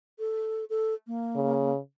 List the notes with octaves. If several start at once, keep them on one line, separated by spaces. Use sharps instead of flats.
A4
A4
A#3
C#3